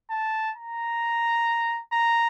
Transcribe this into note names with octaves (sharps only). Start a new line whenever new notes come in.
A5
A#5
A#5